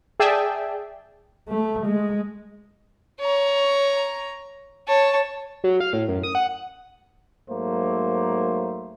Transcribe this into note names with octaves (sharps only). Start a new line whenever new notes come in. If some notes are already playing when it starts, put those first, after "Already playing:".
G#4 D5 E5 G5 A5
A3
G#3
C#5 A#5
C#5 A5
F#3
F5
A2
F#2
D#6
F#5
G#2 F#3 A3 A#3 C5